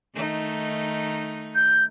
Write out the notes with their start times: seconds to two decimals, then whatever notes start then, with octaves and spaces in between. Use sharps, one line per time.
0.14 D#3 A3 D#4
1.55 G6